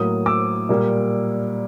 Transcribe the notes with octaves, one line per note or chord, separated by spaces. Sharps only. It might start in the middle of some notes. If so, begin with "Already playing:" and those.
Already playing: A2 F#3 A#3 D#6
D6 E6
A#2 G3 A#3